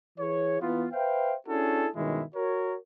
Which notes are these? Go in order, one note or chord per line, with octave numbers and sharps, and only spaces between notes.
E3 E4 G#4 C#5
E3 B3 F4
B4 C5 E5 F5 G5
C#4 D4 E4 F#4 G#4 A4
G2 B2 D#3 G#3 C#4 E4
F#4 A#4 C#5